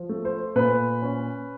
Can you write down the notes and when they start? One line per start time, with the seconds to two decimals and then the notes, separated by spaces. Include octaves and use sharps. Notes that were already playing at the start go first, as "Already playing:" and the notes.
Already playing: F3
0.09 A3
0.25 C5
0.56 A#2 B4
1.02 C#4